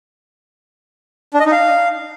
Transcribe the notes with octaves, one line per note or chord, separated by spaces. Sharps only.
D4
D#5
D#4
F5